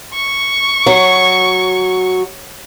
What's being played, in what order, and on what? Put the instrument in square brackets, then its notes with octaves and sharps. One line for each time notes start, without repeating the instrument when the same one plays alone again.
[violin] C#6
[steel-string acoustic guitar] F#3